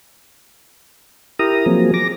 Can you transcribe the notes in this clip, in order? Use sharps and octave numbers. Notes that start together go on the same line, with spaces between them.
E4 G4 A#4 A#5 D#6
F3 F#3 A#3 C4 G#4
D6 A#6